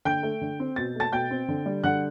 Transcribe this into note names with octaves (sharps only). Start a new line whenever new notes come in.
D3 G5 G6
A3
D3
C4
B2 A6
A3 A5 A6
B2 G5 G6
C4
D3
G3
D3 F#5 F#6